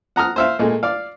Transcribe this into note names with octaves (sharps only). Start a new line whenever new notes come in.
F#5 A#5 D#6 F6
C5 E5 F5
A#2 G#3 A3
D5 F5